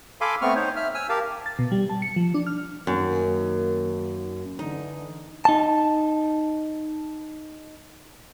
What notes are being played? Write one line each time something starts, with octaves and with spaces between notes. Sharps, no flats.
A4 F5 G#5 B5 C6 D6
A3 B3 C4 C#6 F6
D#4 C5 C#5
E5 F6
G#5 E6 F6
G4 A#4 F5 A5
A6
B2
G3
A5
C#7
F3
D4
F6
F#2 D#3 A#3
D3 E3 D#4
D#4 A5